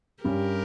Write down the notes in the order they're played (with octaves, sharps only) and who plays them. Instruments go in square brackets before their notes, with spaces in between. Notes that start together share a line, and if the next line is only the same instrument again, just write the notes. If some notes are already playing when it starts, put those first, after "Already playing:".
[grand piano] G2 G3 C#4 [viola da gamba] G4 A#4